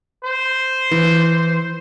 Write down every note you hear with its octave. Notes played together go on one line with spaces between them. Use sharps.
C5
E3